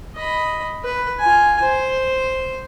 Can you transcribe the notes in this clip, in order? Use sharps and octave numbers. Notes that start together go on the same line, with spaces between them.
D#5 B5
B4
F4 G#5
C5